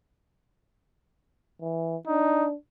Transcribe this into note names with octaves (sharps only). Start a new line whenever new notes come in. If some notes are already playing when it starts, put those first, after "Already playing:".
E3
D4 D#4